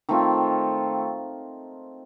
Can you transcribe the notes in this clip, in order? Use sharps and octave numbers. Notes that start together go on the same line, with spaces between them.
D#3 A3 C4 F4